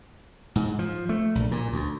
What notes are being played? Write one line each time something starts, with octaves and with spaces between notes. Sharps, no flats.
G#2
F3
A3
A#1
A#2
D2